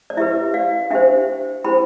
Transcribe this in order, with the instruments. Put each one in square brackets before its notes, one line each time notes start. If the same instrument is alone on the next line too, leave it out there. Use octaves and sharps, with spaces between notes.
[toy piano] D5
E4 G4 B4 E5
D5 F5
D4 G4 C5 E5 G5
E4 G4 C5 G5 B5